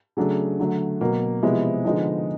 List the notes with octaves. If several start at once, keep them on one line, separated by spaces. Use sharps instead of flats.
C#3 F#3 A3 D4
D3 F#3 A3
B2 F#3 A#3
C3 F3 G#3 B3 E4
D3 F3 G#3 B3 D#4